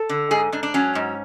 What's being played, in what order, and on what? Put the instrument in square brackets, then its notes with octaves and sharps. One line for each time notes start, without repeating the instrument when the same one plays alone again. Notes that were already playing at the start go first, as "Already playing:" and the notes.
Already playing: [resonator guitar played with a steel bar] A4
D3
G#2 G#4
G#2 D4
D4
F#3 C#4
G#2